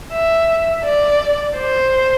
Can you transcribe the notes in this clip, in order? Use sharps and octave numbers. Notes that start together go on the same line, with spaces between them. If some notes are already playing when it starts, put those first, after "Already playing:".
E5
D5
C5